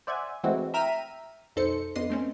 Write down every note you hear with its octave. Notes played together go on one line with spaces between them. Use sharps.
C5 D5 E5 F#5 G#5
E3 G#3 A3 C4 E4 F#4
E5 G5 A#5 F6 B6 D#7
B1 F2 D#4 A4 C5 C#7
F2 B3 D4 D#5 C6
A3 C4 C#4